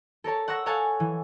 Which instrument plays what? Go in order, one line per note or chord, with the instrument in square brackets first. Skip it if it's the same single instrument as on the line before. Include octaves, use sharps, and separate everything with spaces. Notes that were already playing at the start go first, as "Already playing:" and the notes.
[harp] A4 A#4 C#5 A5
F#5 C#6 E6 A#6 E7
A4 C#5 F5 F#5 G#5 A5
E3